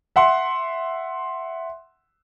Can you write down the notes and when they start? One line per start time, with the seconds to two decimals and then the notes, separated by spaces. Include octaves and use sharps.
0.16 E5 F#5 C6